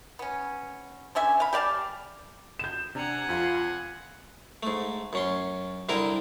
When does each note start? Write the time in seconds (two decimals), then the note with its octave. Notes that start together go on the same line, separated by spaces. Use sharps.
0.19 B3 C#4
1.15 D3 C#4 E5 G#5
1.40 F5 B5
1.53 G4 D5 F5 A5
2.59 G6 E7
2.95 C3 D4 F#5 G#5 A#5
3.29 F2 F4
4.63 G#2 A3
5.13 F#2 C#4 C6
5.89 C2 D3 G3 E4 A#4